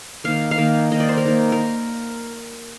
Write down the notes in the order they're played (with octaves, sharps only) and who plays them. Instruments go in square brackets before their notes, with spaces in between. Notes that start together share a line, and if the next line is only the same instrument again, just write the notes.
[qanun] D#3 A#3 F5
F5
D#3 A#3
D#3 A#3 D#5
D5
C5
A#4
D#3 A#3
A#4